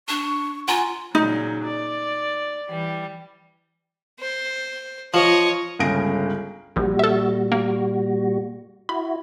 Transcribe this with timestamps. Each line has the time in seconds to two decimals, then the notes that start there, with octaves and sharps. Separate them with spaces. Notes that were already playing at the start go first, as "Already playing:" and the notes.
0.08 D4 C#6
0.68 F4 F#5 G#5 A#5 C6
1.15 A#2 C#3 F#3 D#4
1.65 D5
2.69 E3 G3
4.20 C5
5.14 F3 C#5 D#5
5.79 G1 C#2 C#3 A#6 D7
6.76 A#1 A#2 G3 F#4
6.99 A4 E5
7.52 A#3
8.89 E4 F#4 B5